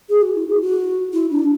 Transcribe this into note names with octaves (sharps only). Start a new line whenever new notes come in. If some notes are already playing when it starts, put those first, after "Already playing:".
G#4
F#4
E4
G#4
F#4
E4
D4